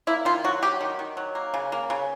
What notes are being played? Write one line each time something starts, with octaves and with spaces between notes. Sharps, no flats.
A#3 E4
D#3 F4
F#3 F#4
F#3 G4
D#3
D#3
F#3
A#3
C#3
A#3
C#3